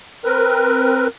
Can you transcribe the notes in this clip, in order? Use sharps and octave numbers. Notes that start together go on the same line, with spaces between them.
C4 A#4 B4